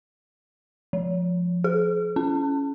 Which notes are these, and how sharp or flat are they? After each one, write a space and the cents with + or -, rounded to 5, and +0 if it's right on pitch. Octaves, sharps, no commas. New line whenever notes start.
F3 +10
G#4 +45
C#4 +10